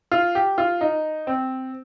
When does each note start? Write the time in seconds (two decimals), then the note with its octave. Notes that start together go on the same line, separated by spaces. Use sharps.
0.11 F4
0.35 G4
0.58 F4
0.81 D#4
1.27 C4